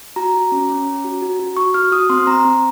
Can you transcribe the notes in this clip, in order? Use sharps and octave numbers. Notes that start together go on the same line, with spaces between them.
F#4 A#5
F#4
C#4
C#4
C#4
F#4
F#4
F#4
F#4 C#6
F#4 F6
F#4 D#6
C4 C6
C4 A#5
C4